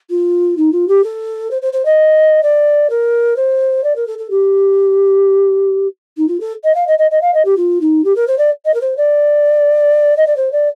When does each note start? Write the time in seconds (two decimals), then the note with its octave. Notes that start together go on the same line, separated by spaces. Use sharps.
0.10 F4
0.57 D#4
0.72 F4
0.88 G4
1.03 A4
1.50 C5
1.62 C5
1.73 C5
1.85 D#5
2.43 D5
2.89 A#4
3.36 C5
3.83 D5
3.95 A#4
4.07 A4
4.18 A4
4.30 G4
6.17 D#4
6.28 F4
6.40 A4
6.64 D#5
6.74 F5
6.87 D#5
6.98 D#5
7.11 D#5
7.21 F5
7.34 D#5
7.45 G4
7.57 F4
7.81 D#4
8.04 G4
8.15 A#4
8.27 C5
8.38 D5
8.65 D#5
8.74 A#4
8.81 C5
8.97 D5
10.17 D#5
10.27 D5
10.36 C5
10.52 D5